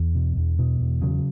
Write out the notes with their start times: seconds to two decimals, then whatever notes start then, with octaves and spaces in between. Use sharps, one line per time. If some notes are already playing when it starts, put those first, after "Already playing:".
Already playing: E2 E3
0.15 B2
0.37 E2
0.59 B2
0.81 E2
1.01 C#3 F#3